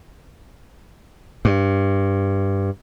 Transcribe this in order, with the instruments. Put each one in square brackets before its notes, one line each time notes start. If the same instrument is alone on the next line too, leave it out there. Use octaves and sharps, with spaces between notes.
[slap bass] G2